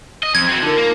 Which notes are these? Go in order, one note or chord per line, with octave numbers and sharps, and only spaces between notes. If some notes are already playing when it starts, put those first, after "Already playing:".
D#5
F2 G#6
C4 F#4
D3 D#4 F4 A#4
A#3